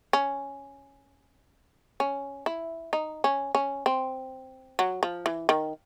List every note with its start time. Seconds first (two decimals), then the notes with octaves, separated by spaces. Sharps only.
0.13 C#4
2.00 C#4
2.46 E4
2.93 D#4
3.24 C#4
3.55 C#4
3.86 C4
4.79 F#3
5.03 F3
5.26 E3
5.49 D#3